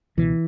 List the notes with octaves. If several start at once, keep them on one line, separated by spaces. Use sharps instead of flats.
C#2 B2 E3